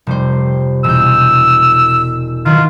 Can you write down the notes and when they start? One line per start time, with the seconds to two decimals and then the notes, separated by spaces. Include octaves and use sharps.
0.07 F1 G3 C5
0.84 E1 E6 G6
2.46 D#3 F#3 F4